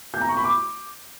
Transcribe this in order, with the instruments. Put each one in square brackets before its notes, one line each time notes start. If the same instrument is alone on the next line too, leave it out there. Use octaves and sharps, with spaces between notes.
[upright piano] G6
A#5
C#6
B5
D6